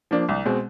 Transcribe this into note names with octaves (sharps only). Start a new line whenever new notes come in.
F3 A#3 D4
C2
B2 G#3 C4